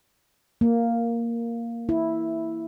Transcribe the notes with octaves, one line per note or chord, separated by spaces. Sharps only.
A#3
E4